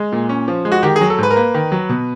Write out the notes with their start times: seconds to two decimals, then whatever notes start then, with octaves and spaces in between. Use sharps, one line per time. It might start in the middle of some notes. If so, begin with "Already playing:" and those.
Already playing: G#3
0.12 A#2
0.29 C#4
0.48 F3
0.65 G#3
0.72 F#4
0.83 D#3 G4
0.96 G#4
1.01 F#3
1.10 A4
1.18 G#2 B4
1.31 A#4
1.36 A#3 B4
1.54 D#3
1.72 F#3
1.89 B2